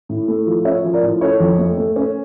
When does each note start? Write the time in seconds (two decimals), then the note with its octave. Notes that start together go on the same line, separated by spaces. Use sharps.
0.09 A2
0.28 A3
0.47 F3
0.65 C#4 C#5 E5
0.84 F3
0.93 A#4 D5
1.03 A2
1.21 C#4 A4 C#5
1.40 F2
1.58 A3
1.78 A3
1.96 C#4